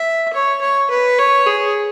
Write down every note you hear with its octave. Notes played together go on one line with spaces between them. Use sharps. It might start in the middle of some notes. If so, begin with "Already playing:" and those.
Already playing: E5
C#5
C#5
B4
C#5
G#4